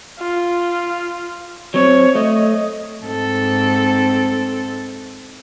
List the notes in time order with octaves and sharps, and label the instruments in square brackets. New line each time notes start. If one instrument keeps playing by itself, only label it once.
[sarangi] F4
[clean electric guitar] F#3 C4 [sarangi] C#5
[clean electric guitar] A3 [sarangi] D#5
[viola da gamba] G#2 C4 A4